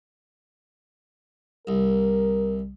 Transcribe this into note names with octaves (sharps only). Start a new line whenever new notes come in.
C2 A#4